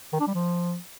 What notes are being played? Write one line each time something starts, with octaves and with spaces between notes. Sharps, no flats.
D#3
D4
G3
F3